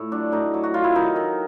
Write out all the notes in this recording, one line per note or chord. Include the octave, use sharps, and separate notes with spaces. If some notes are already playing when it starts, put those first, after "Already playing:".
Already playing: A2
F#3 D4
A2 D#4
F#3
F#4
F#3 F4
E4
D#3 D#4
D#3